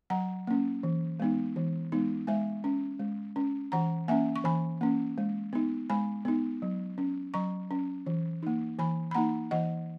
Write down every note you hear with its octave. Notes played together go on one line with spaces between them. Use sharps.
F#3 F#5 A#5
A#3 C#4
E3
G#3 B3 D#4
E3
G#3 B3 D#4
G#3 E5 G#5
C#4
G#3
C#4
E3 F#5 A#5
A#3 C#4 E5 G#5
C#6
E3 G#5 B5
A#3 C#4
G#3
B3 D#4
G#3 G#5 B5
B3 D#4
F#3
C#4
F#3 A#5 C#6
C#4
E3
A#3 D#4
E3 G#5 B5
B5
A#3 D#4 F#5 A#5
E3 D#5 F#5